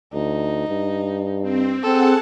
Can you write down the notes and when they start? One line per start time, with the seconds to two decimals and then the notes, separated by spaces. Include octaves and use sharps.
0.13 D2 D#4
0.68 G2
1.42 C4
1.83 C4 G#4 A4 F#5 A5